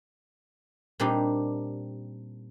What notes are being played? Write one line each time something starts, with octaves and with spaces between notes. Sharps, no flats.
A#2 G3 C4 D4 D#4 G4